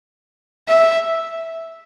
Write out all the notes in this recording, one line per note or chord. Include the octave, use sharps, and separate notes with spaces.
E5